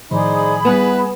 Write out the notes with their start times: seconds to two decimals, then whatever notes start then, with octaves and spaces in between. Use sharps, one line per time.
0.11 A2 D#3 F3 D#4 G#4 C5 D5 B5
0.65 G3 B3 E4 B4 E7